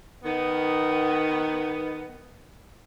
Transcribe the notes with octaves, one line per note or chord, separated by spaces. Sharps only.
D#3 B3